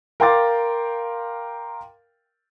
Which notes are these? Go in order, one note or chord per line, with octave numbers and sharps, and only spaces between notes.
A#4 F5 G5 C6 D6 A6